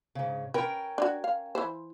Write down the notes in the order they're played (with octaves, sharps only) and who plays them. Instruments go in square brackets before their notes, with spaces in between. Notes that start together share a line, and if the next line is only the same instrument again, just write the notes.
[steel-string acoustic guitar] G#2 C#3
[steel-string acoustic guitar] C#4 A#4 G5 [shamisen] B4
[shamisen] D4 D#4 F#4
F5
E3 B4 C5